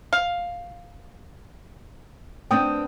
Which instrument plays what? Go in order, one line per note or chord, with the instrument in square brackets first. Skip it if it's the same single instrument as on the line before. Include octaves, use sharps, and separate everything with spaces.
[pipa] F5
[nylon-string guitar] B3 C4 D4 [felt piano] G5 D#6